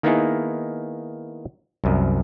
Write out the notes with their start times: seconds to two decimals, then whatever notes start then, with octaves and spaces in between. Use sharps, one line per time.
0.03 D#3 A#3 B3 D#4 E4 G#4
1.84 C2 F#2